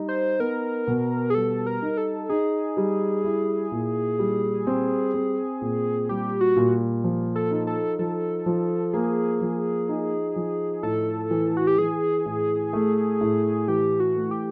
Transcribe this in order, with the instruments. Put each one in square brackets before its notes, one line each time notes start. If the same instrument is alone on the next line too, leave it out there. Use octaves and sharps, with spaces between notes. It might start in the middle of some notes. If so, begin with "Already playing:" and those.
Already playing: [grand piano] G3 D#4
[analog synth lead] C5
[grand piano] B3 [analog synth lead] A#4
[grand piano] B2
[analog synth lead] G#4
[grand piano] G3 [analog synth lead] A4
[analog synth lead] A#4
[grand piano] D#4
[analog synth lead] A4
[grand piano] D#4 [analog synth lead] G#4
[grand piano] G3
E4
A#2
G3
C4
C4
A#2
[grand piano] G3 [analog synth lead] G4
[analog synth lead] F#4
[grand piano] A#2
F3
[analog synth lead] A4
[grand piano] D#4
[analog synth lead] A4
[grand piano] F3 [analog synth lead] A4
[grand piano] F3
[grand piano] A#3 [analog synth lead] G#4
[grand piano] F3
D#4
F3
[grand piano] A2 [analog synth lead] A4
[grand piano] E3
[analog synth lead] F#4
G4
[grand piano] E3 [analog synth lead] G#4
[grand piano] A2
A3
A2
[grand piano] E3 [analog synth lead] G4
[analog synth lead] F#4
[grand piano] A3
[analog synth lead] G4